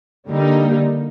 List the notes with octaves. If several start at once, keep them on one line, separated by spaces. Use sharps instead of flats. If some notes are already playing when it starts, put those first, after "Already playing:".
D3 G3 A#3 D#4